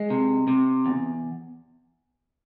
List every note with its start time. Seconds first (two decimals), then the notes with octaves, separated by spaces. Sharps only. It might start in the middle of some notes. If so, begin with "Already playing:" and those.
Already playing: G#3
0.10 C3
0.48 C3
0.86 E2